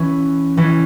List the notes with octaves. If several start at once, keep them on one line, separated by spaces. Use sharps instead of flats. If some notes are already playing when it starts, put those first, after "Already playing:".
Already playing: E3 C#4 E4
E3 C#4 E4